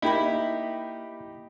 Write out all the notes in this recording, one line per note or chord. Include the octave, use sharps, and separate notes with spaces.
A#3 D#4 E4 G4 B5